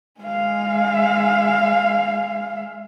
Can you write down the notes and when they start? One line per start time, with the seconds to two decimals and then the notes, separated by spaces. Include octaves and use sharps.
0.21 G#3 F5